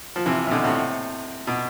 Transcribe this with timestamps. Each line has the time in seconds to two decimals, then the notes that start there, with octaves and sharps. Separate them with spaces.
0.16 F3
0.26 C3 E3
0.47 C3
0.51 B2 D3
0.64 A2 C3
1.47 B2